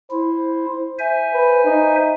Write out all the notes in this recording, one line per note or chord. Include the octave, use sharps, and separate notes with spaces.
E4 C5
C5 E5 G#5
B4
D#4